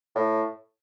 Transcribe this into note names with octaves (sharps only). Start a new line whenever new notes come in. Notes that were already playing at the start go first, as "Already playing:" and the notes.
A2